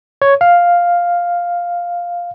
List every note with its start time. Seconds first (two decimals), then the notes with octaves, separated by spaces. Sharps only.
0.22 C#5
0.41 F5